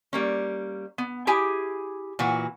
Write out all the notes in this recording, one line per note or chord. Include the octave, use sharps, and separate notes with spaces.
G3 A#3 C#4
B3
E4 G4 G#4 G#5
A#2 E3 F#4